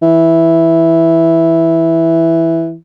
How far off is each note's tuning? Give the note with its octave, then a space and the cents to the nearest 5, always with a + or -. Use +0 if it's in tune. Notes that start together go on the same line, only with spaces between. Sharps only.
E3 +0